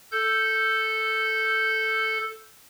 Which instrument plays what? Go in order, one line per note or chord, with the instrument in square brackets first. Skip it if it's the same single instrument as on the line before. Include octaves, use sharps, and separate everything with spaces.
[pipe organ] A4 G6